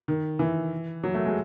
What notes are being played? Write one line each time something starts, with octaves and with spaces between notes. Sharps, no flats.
D#3
E3
F#3
A3
G#3